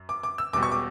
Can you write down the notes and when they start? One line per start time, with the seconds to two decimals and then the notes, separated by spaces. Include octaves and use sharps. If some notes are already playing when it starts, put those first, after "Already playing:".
Already playing: F#2
0.09 D6
0.23 D6
0.38 E6
0.53 E1 E2 B2 G3 D6
0.63 C#6
0.72 D6